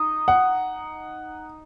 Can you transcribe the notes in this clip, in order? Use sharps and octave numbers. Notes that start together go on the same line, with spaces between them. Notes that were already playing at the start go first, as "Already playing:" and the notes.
Already playing: D#4 D#5
F#5